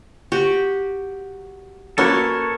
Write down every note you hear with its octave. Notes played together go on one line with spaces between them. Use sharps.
F#4 G4
A#3 C#4 F#4 A4 B4 C#5